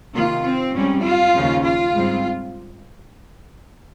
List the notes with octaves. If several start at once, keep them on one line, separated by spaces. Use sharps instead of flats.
C3 D#3 A#3 F4
C4
G#2 G3 C4 C#4
F4
D#2 C#3 F3
F4
G#2 G3 C4